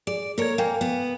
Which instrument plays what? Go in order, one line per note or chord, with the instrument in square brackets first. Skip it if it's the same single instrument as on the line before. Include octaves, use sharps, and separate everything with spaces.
[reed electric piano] G#4 [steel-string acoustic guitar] D5
[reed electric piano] A#3 A4 G#6 [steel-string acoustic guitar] A#4 C#5
[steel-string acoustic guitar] A#3 [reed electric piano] F5 G5 G#5
[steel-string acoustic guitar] B3